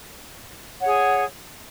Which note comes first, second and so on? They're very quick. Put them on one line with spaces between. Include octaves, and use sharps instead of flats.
C#5 F#5 G#4